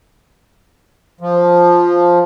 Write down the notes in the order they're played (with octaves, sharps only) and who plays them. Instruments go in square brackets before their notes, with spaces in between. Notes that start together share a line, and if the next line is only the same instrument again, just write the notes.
[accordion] F3